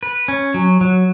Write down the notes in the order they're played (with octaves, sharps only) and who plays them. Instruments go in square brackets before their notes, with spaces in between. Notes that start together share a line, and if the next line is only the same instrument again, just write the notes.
[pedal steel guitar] B4
C#4
F#3
F#3